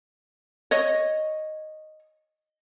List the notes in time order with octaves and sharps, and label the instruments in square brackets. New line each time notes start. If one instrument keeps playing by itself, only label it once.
[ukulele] C#5 D#5